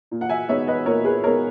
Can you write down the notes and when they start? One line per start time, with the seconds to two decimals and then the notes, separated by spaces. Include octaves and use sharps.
0.11 A#2
0.21 F#5
0.29 E5 G#5
0.48 G#3 B3 D#4 C#5 E5
0.67 B4 D#5
0.86 A#2 A#4 C#5
1.04 G#4 B4
1.23 G#3 B3 D#4 A#4 C#5